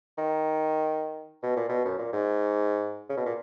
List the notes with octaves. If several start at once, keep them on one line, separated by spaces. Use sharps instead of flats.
D#3
B2
A#2
B2
F#2
A#2
G#2
C#3
B2
A#2